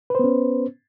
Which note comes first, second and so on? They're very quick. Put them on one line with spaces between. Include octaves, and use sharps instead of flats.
B4 C5 B3 C#4